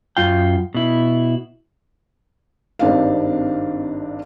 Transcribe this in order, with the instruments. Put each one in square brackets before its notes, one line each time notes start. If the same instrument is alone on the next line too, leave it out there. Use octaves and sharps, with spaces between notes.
[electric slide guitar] F#2 F4 F5 G5
B2 E4
[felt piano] G#1 G2 C4 D4 D#4 F5